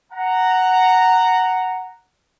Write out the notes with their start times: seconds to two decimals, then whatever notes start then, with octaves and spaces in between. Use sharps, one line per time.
0.13 F#5 A#5